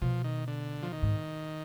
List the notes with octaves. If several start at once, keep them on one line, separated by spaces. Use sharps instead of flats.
B2 F3
D#3
D3
F3
D#3
G#2